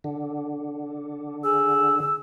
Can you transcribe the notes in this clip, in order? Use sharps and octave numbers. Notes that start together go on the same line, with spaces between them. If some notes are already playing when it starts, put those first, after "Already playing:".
D3
G#4 E6